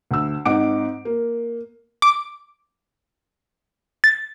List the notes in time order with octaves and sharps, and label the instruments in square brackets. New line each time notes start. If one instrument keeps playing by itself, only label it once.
[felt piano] D2 E6
G#2 C4 D#4 F#5 D6 D7
A#3
[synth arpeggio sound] D6
A6